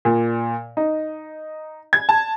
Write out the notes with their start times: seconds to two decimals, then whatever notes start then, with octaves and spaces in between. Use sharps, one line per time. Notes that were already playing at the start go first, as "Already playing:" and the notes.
0.05 A#2
0.77 D#4
1.93 G#6
2.09 A5